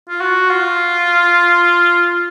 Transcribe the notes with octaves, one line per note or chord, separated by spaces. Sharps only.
F4
F#4
F4